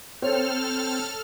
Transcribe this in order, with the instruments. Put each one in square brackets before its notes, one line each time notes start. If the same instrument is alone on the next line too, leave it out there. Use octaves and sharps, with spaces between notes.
[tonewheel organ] C4 [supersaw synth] A4 F6 [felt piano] C5 C#5